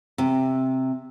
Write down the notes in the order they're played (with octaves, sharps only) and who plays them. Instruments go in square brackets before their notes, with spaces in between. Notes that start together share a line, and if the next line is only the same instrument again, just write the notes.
[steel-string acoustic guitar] C3